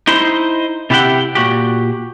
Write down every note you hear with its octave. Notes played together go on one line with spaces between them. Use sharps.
D#4 E4 C5
C3 E4 G4 E5 F#5 G5
A#2 F#4 G4